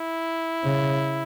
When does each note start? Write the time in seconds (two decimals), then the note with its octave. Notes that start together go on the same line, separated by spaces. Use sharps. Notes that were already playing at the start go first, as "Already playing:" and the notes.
Already playing: E4
0.63 C#3